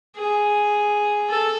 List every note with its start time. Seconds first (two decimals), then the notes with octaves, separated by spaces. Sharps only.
0.17 G#4
1.29 A4